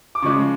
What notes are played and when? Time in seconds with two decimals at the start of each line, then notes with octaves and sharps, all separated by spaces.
0.15 D6
0.22 C#3 F3 G#3 C#6